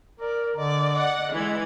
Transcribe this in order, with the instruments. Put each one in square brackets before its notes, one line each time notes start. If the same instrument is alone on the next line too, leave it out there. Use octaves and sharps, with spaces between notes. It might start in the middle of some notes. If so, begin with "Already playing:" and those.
[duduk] A#4 [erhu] D5
[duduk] D3 [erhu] D5 [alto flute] D#5
[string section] F#5
[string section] E3 [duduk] G#3 [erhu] G#6